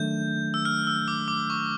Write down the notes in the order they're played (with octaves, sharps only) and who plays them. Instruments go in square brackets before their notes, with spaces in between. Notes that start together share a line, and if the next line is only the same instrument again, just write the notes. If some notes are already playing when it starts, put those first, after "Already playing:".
Already playing: [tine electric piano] D#3 F#3 A3 D4 [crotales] G6
[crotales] E6
F6
E6
D6
D6
C#6